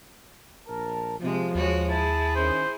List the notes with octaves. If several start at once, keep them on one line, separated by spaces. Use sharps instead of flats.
A#1 A#4 A5
C3 F3 G#3
D#2 G#3 F#4 C#5
E4 G#4 A5
D#3 G#3 C#4 C5